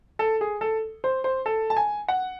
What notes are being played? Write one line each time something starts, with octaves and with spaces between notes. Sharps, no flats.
A4
G#4
A4
C5
C5
A4
A5
G#5
F#5